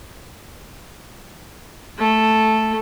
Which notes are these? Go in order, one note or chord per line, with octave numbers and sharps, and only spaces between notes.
A3 A4